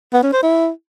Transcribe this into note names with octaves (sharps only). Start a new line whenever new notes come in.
B3
C#4
C5
E4